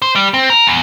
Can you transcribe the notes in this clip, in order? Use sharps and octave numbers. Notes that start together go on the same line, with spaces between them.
C5
G3
C4
A#4
E2